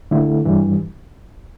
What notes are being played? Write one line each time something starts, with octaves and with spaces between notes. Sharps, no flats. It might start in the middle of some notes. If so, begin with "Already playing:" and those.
D3 A3 E4
G2 E3 G3